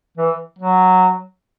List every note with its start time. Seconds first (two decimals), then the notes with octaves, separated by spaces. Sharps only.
0.17 E3
0.59 F#3